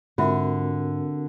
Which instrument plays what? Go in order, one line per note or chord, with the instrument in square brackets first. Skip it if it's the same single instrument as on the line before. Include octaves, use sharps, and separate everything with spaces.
[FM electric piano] G#2 [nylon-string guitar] D3 [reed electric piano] C4 F#4 A#4 [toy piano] F4 E5